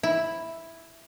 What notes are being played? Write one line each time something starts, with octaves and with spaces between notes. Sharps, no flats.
E4